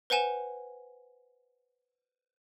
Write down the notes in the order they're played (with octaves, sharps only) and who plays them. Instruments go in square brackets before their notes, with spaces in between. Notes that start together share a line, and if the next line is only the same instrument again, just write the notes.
[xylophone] B4 C5 F#5 G#5 E7